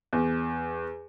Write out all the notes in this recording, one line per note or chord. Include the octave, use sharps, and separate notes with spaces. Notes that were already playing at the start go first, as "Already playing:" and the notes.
E2